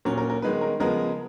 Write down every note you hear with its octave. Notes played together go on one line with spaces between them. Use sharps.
A#2 F#3 C#4 A#4
A#4
A#4
D#3 G#3 B3 B4
A#4
C#3 F3 G#3 B3 A#4